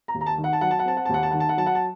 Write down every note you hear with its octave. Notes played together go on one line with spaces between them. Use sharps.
A#5
D#2
A#5
A5
D#3
F#5
A5
F#3 F#5
A5
F#5
C4 A5
F#5
A5
D#2 F#5
A5
D#3 F#5
A5
F#5
F#3 A5
F#5
A5